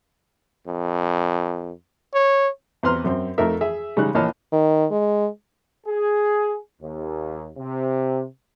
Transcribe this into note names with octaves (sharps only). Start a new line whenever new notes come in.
F2
C#5
E2 C4 B4 A#5 C6 F6
F#2 C4
F2 A3 D#4 A#4 E5
G#4 E5
C#3 G3 G#3 D#4 F#6
A#1 E3 C#5 D#5 A5 F6
D#3
G#3
G#4
D#2
C3